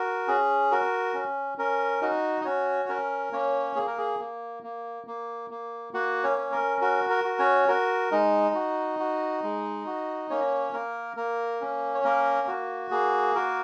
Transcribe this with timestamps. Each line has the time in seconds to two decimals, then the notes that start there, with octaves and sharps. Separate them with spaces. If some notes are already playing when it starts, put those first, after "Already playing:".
Already playing: F#4 A#4
0.28 C#4 G#4
0.71 F#4 A#4
1.14 C#4
1.58 C#4 A#4
2.02 D#4 F#4 D#5
2.41 D#5
2.45 C#4 F#4 C#5
2.89 C#4 A#4
3.32 A#3 C#4 C#5
3.76 A#3 G#4
3.87 A#4
3.97 G#4
4.19 A#3
4.63 A#3
5.07 A#3
5.50 A#3
5.93 A#3 F#4 F#5
6.24 C#4 C#5
6.38 C#4
6.52 A#4
6.81 F#4 A#4
7.10 A#4
7.24 F#4
7.39 C#4 C#5
7.68 F#4 A#4
8.11 G#3 D#4 D#5
8.55 F#4
8.99 F#4
9.43 G#3
9.86 F#4
10.30 A#3 C#4 C#5
10.73 A#3 A#4
11.17 A#3 A#4
11.61 C#4
11.95 C#5
12.04 A#3 A#4
12.48 F#4
12.91 A#3 G#4
13.35 F#4 A#4